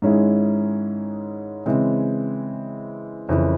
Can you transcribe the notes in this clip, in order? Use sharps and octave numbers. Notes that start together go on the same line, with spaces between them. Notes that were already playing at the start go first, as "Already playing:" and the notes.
G#2 D#3 G#3 C#4 E4
C#3 E3 G#3 C4
F2 C#3 E3